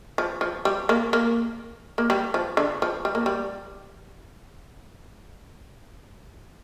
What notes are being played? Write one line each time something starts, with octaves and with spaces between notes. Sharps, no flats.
F3
F3
G3
A#3
A#3
A#3
G3
F3
D3
F3
G3
A#3
G3